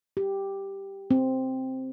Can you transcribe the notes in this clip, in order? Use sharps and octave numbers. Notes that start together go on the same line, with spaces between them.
G4
C4